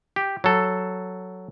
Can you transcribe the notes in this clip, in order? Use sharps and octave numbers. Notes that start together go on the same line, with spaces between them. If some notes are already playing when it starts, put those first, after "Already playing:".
G4
F#3 A4